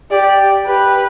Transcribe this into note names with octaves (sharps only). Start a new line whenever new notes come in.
G4 D5
G4 B4